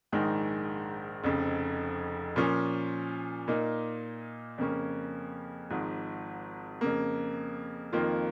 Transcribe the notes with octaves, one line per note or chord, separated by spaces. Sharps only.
A#1 G#2 D#3 G#3
F1 F2 C#3
A#2 F3 C#4
A#2 A#3 D#4
F2 C#3 A#3 C#4
G#1 G#2 F3
F2 C#3 A#3
F2 D#3 A#3 F4